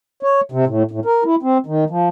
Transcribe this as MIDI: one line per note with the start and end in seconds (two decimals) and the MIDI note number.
0.23 0.41 73
0.52 0.65 48
0.67 0.83 45
0.91 1.00 45
1.05 1.24 70
1.25 1.36 64
1.43 1.58 60
1.66 1.84 51
1.90 2.09 53